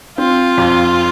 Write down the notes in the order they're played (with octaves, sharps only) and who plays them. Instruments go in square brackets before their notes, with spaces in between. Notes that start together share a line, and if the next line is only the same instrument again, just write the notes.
[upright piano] C4 [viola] F4
[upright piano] F2